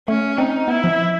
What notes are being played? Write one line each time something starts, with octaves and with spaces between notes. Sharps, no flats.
A3 C#4
C4 D#4
B3 E4
F3